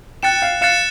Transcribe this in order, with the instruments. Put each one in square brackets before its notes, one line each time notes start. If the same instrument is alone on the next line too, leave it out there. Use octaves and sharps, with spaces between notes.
[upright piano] G5 [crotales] F#6 A6 C#7 E7
[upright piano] F5
[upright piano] F5 [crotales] F#6 A6 C#7 E7